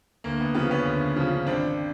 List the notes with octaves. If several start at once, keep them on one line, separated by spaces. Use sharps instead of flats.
D2 A#3
B3
C#3 F3 B3
B3 C#4
D2
C#3 F3
G#1 C4 D4